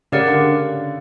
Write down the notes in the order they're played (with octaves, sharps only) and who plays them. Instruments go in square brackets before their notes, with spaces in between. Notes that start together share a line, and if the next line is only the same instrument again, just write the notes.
[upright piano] C#3 [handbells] G4 A#4 D5 F#5
[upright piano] D3